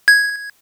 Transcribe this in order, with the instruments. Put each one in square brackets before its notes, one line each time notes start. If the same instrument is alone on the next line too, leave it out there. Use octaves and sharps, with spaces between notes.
[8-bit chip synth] G#6